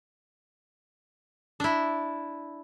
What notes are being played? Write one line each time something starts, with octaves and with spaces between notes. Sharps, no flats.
D4 E4